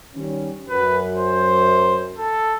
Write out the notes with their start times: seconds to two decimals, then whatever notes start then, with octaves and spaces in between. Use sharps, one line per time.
0.16 D#3 G3 C#4
0.69 F#2 B4
1.15 C5
2.17 A4